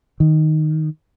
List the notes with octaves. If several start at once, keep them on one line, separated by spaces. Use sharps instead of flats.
D#3